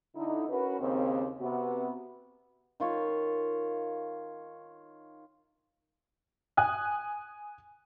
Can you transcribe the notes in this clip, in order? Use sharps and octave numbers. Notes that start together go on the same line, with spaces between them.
D3 D#4 E4
C#4 F#4 A#4 B4
D#2 C#3 C4
C3 B3 F#4
D#3 F4 C#5
G#5 D#6 F#6